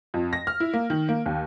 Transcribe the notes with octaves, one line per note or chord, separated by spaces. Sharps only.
F2
A#6
F6
E4
A#3
D#3
A#3
D#2